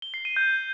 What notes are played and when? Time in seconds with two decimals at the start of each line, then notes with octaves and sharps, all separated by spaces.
0.02 G7
0.14 C7
0.25 D#7
0.36 G6